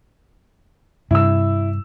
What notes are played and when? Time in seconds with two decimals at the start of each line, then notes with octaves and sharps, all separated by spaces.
1.11 G2 C3 E4 E6